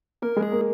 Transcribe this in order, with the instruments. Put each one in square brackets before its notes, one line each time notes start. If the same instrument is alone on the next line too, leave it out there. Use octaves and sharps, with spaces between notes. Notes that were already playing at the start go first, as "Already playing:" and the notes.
[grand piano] A#3 [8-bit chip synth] A#4
[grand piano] G#3
[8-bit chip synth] G#4
[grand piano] A#3